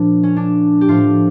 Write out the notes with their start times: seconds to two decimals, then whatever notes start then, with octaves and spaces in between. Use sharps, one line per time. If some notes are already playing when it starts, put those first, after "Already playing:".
Already playing: A#2 F3 D4
0.23 C#4
0.36 D4
0.81 G4
0.88 A2 F3 F4